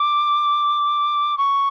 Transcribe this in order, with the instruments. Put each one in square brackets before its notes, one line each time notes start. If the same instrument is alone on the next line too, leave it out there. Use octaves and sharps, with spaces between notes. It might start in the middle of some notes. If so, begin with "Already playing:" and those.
Already playing: [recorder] D6
C#6